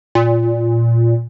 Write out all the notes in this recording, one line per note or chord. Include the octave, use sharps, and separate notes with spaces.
A#2